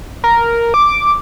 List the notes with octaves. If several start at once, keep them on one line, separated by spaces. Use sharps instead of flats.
A#4
D6